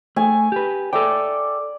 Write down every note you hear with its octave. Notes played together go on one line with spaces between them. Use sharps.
A3 G#5
G4 B4
A4 D5 E5 G5